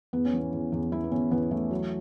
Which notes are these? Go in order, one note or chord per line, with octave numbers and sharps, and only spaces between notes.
E2 B3
C#4
E3 B3
E2
E2
E3 E4
B3
E2 C#4
E2 B3
E3 A3
F#3